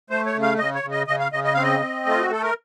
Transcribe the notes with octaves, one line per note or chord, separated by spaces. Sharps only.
A3 C5
C#5
C#3
F5
C#3 D#5
C#5
C#3
D#5
C#3 D#5
F5
C#3 D#5
D#5
C4 F5
D#5
C4
A3 F4
F#4
A3 A4
A#4